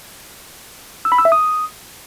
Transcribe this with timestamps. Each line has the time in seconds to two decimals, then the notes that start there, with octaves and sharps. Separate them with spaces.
1.05 E6
1.12 B5
1.18 E6
1.25 E5
1.32 D#6